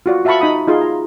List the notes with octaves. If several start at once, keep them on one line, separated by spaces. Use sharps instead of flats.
F4 F#4 D5
F#4 E5 F5 A5 B5 C#6
D#4 B5 D#6
D#4 F4 G#4 C6
A#5